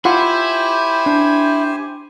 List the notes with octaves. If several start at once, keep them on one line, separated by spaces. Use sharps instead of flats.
E4 F4 G4 C5 F#5 G#5 C6
D4